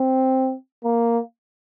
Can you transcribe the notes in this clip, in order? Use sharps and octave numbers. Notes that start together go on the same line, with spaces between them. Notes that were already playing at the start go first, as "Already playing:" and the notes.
Already playing: C4
A#3